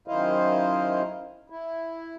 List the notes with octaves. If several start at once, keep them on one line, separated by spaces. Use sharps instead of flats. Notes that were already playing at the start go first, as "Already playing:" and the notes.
F#2 D#3 E4 C5 D#5 F5
E4